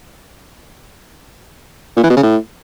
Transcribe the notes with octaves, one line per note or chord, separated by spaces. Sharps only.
A#2
E3
B2
C#3
A2